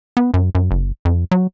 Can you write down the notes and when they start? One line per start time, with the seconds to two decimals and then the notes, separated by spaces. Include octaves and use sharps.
0.17 B3
0.34 F#2
0.55 F#2
0.71 F#1
1.05 F2
1.31 F#3